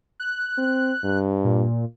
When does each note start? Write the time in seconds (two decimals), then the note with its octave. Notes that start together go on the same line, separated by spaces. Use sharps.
0.20 F#6
0.58 C4
1.04 G2
1.44 A#2